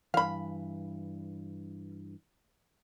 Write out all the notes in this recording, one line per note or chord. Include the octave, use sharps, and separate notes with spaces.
G2 E3 F5 B5